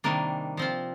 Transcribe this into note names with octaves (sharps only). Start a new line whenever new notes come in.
C3 D#3 G3 A#3 D4
F3 C4 F4